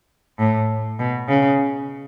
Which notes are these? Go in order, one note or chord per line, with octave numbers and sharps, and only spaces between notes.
A2
B2
C#3